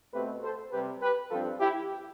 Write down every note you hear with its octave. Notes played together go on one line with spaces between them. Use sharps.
B2 A3 C4 G4 B4
A4 C5
C3 G3 C4 G4 B4
G4 B4
G2 F3 C4 F4 A4
E4 G4